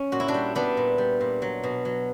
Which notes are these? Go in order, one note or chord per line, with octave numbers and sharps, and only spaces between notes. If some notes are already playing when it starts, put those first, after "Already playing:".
Already playing: C#4
A#2 F#4
E4
D4 F#4
G3
G3 B3 D4
A#2
G3
A#2
F#3
B2
F#3